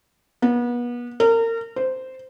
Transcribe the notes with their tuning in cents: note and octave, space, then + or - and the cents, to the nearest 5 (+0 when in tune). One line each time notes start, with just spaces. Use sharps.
B3 -35
A#4 -30
C5 -10